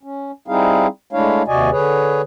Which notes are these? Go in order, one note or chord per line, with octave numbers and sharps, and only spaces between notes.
C#4
G3 C4 D#4 E4 G#4 F5
G#3 A3 D4 E4 C#5 F5
D#2 C3 F#4 D5 D#5 G#5
D3 G#4 B4 C#5